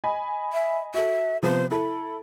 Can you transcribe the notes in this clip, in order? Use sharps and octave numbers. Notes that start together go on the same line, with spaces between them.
D#5 G#5 B5
E5
F#4 A4 E5
C3 F3 B3 C5
E4 A4 B5